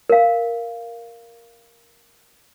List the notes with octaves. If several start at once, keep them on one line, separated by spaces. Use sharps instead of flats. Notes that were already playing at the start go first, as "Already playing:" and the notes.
A#4 F5